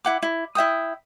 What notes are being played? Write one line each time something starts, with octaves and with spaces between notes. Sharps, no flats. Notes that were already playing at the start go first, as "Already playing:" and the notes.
E4 F#5 D6
E4
E4 E5 G5 D#6